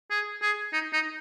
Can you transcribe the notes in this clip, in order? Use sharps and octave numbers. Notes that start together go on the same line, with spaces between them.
G#4
G#4
D#4
D#4